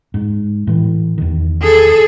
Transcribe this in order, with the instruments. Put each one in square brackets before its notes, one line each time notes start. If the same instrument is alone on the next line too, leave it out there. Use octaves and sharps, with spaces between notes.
[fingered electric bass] G#2
A2 E3
E2 D#3
[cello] G#4 A4